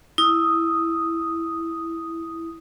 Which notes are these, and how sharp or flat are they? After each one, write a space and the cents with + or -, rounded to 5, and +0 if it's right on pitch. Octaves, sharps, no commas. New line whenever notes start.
E4 +0 D#6 +0